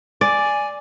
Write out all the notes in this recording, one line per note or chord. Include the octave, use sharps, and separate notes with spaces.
D5 G#5